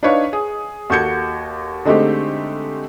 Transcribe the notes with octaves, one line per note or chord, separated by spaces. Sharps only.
D4 D#4 B4 C#5 F5
G#4
D#2 F#4 A4 G6 G#6 C#7
D3 G#3 A3 C4 D#4 G4